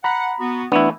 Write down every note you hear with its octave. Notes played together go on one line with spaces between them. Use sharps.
F#5 A#5 B5
B3 F#4
E3 A3 B3 D4 E4